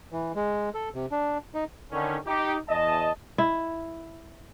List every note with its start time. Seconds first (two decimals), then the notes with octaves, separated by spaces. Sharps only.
0.12 E3
0.35 G#3
0.74 A4
0.95 C3
1.11 D4
1.54 D#4
1.92 D3 D#3 C#4
2.26 D#4 G4
2.69 E2 D#5 A5
3.38 E4